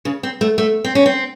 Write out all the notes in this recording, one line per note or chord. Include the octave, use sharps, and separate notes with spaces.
C#3
C4
A3
A3
C4
C#4
C4